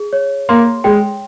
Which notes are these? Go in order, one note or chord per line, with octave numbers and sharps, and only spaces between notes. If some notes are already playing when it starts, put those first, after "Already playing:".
Already playing: G#4
C#5
A#3 C6
G#3 G5